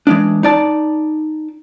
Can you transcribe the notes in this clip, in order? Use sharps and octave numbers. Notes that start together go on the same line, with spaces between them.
E3 G#3 D4
D#4 D5 A5